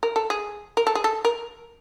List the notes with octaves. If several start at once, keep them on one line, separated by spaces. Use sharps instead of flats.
A#4
A4
G#4
A#4
A4
G#4
A4
A#4